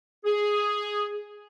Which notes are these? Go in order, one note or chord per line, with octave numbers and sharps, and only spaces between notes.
G#4